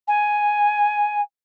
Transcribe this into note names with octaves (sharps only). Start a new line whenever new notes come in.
G#5